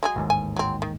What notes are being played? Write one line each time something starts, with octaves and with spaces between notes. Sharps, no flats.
F#3 G#3 G#4
A1 D#2 G#2
G#5
F#3 C4
D#3